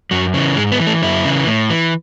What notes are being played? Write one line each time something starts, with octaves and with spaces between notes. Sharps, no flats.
F#2 F#3
C#3 E3
G#2 G#3
B3
E3
A3
F#2 E4
C#3 E3
A2
E3